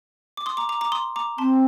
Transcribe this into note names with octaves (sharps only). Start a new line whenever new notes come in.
D6
C6 D#6
A#5 D6
A#5 D6
A#5 D6
C6 D#6
A#5 D6
C4 A5 C6